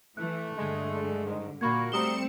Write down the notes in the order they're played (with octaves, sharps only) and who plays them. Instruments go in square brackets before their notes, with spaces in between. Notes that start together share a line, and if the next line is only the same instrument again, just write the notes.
[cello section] E3 [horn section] A3 [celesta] F#6
[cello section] G2 D3 [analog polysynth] G#3
[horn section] G#2 D#3
[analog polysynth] A#2 A#3 [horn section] F#4 A#4 [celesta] B5 C#6 G#6
[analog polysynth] G3 C#7 E7 [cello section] A3 C4 [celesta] A#5 D#6 G7